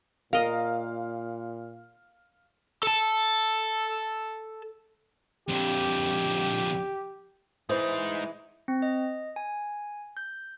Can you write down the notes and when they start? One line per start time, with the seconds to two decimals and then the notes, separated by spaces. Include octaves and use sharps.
0.33 A#2 A#4 D#5 F5
2.83 A4 A5
5.49 F2 D3 G4
7.69 E3 G#3 D#4 C5
8.68 C4
8.82 D#5
9.36 G#5
10.17 G6